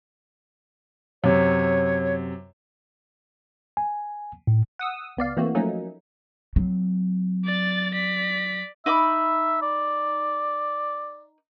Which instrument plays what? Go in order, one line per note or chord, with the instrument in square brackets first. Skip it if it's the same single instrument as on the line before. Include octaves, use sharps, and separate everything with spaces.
[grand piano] F#2 C3 [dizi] C#5
[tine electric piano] G#5
A2
[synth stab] F#5 D#6 E6
C#2 B3 D5 F5
E3 A3 A#3 C4 F#4
F3 F#3 A3 A#3 C#4 D#4
[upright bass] F#3 C4
[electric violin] D5 A6
D5 B6
[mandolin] D#4 B5 D6 [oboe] E5
[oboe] D5